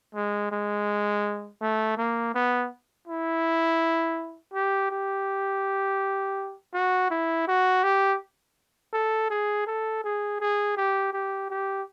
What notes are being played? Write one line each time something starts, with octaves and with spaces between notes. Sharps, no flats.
G#3
G#3
A3
A#3
B3
E4
G4
G4
F#4
E4
F#4
G4
A4
G#4
A4
G#4
G#4
G4
G4
G4